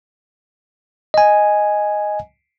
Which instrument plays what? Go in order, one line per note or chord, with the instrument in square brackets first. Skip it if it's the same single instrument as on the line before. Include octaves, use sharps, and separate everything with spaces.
[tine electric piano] D#5 G#5